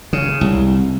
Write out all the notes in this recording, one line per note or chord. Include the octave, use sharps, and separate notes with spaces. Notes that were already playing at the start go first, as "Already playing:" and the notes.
C#3
C2